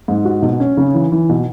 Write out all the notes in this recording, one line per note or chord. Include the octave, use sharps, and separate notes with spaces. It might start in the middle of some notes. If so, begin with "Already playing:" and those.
G#2
F#4
B2
C#4
C#3
E3
E3
B2